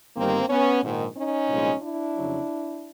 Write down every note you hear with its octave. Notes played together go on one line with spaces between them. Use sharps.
G1 G2 D#3 G3 A#3 C4
B3 C#4
A#1 G#2 D#3
C#4 D#4
C2 A#2 F3 G#3
D4 E4
F2 C#3 F#3